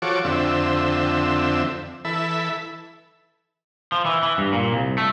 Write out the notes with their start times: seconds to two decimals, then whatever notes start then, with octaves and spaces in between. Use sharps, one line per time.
0.02 F3 F#4 A4 C#5 D6
0.25 F2 D3 C4 E5
2.05 E3 A4 E5 B5
3.92 F3
4.05 E3
4.23 E3
4.38 G2
4.53 A#2
4.73 C2
4.98 A3